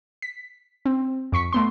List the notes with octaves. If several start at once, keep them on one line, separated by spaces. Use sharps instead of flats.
B6
C4
F2 C#6 B6 C#7
A3 B3 C6